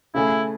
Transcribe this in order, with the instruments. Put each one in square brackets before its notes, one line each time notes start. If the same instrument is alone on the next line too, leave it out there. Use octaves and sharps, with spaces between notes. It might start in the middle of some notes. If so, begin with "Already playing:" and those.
[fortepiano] C#3 E3 A3 C#4 G#4 [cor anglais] E4